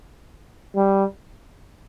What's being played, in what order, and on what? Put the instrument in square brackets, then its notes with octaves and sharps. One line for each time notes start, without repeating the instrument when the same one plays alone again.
[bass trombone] G3